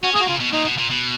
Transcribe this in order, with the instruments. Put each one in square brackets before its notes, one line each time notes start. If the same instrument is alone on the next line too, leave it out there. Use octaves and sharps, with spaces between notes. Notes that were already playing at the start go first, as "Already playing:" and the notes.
[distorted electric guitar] C#4 [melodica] F#4
[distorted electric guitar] A#3 [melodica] G#4
[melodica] F#4
[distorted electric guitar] C#3 [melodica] F4
[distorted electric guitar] B2
[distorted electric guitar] A#2 [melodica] D#4
[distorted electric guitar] B2
A#2
B2